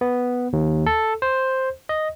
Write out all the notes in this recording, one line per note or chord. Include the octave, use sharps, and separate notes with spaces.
B3
D#2
A4
C5
D#5